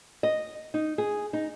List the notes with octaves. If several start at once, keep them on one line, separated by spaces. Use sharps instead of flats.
D#5
D#4
G#4
D#4